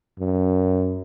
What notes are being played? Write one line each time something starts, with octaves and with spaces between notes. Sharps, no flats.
F#2